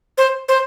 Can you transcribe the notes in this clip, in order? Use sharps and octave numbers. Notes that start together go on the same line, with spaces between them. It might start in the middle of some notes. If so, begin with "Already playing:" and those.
C5
C5